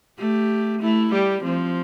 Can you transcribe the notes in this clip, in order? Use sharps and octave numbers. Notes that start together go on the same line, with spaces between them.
A3 G4
A3 E4
G3 G4
F3 C4